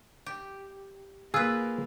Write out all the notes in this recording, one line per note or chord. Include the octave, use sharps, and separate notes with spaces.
G4
A#3 F4 G#4 B4 E6